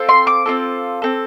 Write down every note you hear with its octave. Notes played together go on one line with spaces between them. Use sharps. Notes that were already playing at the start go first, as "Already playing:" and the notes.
Already playing: C4 F4 A4
C6
D6
C4 F4 A4
C4 A4